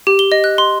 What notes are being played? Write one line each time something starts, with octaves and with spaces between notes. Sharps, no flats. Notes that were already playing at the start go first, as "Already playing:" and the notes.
G4
G7
D#5
F#6
C6